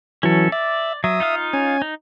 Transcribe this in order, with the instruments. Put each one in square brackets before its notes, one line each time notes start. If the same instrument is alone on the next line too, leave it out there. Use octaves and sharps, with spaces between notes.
[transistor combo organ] E3 F#3 [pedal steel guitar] C#4 A4
[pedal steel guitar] D5 [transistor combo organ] E5
[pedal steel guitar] F#3 [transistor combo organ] E5 D#6
[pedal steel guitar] D#4 F4 F5
[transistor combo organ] C#4 G#5
[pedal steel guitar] D#4